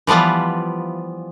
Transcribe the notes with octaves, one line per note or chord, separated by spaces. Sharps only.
E3 F3 G3 B3 F4